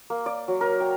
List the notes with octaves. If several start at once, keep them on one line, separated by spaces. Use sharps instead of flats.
A#3
D5
F#3
A#4
G5